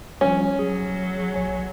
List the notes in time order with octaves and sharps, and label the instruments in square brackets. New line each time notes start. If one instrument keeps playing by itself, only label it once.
[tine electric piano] F3 G3 [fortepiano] C#4
[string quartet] F#3 [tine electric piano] G#4
[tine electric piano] A#1 C#5 G#5